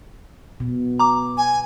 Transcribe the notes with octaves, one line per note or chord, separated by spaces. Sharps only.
B2
A#5 D6
G#5